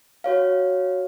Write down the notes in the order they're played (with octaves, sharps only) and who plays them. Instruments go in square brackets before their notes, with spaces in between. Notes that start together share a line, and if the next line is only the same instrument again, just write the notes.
[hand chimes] F#4 C#5 F5